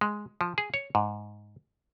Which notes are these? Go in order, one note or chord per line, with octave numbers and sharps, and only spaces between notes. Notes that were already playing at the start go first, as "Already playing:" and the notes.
G#3
F3
G#4
C#5
G#2